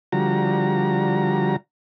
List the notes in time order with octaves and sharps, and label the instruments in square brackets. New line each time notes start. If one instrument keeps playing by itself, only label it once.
[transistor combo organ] D3 F3 G3 F#4 A#5